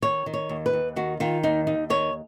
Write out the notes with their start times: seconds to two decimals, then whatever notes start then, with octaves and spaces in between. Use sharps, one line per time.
0.02 D#3 C#5
0.26 D#3
0.34 C#5
0.49 D#2
0.66 B4
0.73 D#2
0.96 D#3 F#4
1.20 D#3 F4
1.43 D#2 D#4
1.67 D#2 D#4
1.90 D#3 C#5